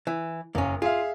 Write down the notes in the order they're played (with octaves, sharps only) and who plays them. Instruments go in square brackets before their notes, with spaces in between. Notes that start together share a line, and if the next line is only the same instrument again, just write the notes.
[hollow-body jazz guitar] E3
[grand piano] F#1 [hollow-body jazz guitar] A#3 C#4
[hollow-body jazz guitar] F4 [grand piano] G#4 E5 F5